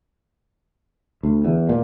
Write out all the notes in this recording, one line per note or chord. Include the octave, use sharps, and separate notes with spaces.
D2
E2
A#2